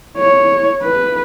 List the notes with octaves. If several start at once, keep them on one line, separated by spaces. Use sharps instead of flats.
C#5
B4